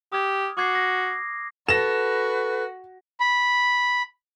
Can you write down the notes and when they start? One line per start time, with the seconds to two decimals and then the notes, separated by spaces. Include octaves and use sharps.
0.12 G4 D#6 F6 G#6
0.57 F#4 D6 G#6 C7
0.75 A#6
1.69 F#4 A4 B4 A#6 E7
3.20 B5